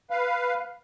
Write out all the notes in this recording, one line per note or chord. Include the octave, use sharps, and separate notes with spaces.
B4 F5